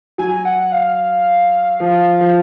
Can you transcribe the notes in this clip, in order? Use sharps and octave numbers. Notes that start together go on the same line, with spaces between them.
F#3 G#5
F#5
F5
F3
F3